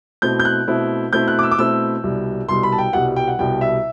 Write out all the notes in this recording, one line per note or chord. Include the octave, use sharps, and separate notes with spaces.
B2 A3 C4 E4 G6
G6
F#6
B2 A3 C4 E4
B2 A3 C4 E4 G6
F#6
D6
E6
D6
B2 A3 C4 E4 E6
C2 B2 G3
C2 B2 G3 C6
B5
A5
G5
C2 B2 G3 F#5
G5
F#5
C2 B2 G3 G5
E5